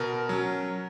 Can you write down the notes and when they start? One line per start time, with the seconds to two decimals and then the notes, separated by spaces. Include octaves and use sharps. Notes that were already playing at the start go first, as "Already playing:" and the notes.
Already playing: B2 A#4
0.29 F#3 C#4